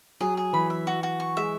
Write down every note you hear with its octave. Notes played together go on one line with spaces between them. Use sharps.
F#3 G#4
G#4
E3 B5
E5
F#4
F#4
C#6
G#3 E5